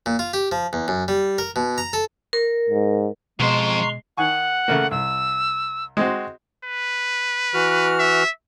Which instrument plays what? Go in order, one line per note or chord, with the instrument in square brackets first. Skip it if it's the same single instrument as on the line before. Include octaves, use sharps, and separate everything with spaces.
[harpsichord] A#2
F4
G4
F3
E2
F#2
G3
A#4
B2
A#5
A4
[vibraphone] A#4
[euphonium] G#2
[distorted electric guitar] F2 C5 [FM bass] B2 [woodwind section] G#3 [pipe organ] A#5 C6 C#6
[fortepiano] D#3 G#5 C#6 [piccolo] F#5
[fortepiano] C#3 A3 A#3
[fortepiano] C2 [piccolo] E6
[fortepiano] G#3 C4 F#4
[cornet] B4
[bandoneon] E3 F#4 F6
[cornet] E5